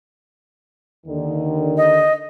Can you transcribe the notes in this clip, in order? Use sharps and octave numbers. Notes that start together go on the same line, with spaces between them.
D#2 D3 D#3
D#5